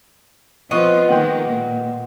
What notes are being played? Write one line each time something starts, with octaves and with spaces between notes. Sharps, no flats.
F3 B3 C4 F4 B4 D#5 C#6
D#3 G#3 A#3 F#5 G5
A#2